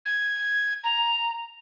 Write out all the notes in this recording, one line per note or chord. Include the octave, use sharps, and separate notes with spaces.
G#6
A#5